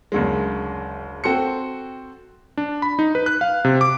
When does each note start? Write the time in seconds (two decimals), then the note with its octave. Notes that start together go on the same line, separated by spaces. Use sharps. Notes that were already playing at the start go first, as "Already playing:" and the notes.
0.12 F#1 D2 G#3
1.24 C4 F#4 A4 G5 C6 C#7
2.57 D4
2.82 B5
2.99 D#4
3.15 B4
3.26 F#6
3.41 F5
3.65 C3
3.81 D6